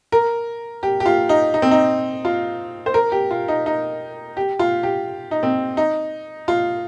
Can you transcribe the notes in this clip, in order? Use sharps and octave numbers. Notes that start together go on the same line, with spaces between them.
A#4
G4
G4
F4
D#4
D#4
C4
D#4
F4
C5
A#4
G4
F4
D#4
D#4
G4
F4
G4
D#4
C4
D#4
F4